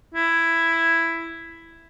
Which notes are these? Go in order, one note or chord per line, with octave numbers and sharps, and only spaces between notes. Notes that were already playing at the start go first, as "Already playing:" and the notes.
E4